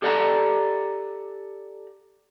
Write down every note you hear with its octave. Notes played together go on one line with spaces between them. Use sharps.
G4 A4 D5 E5 F#5 A#5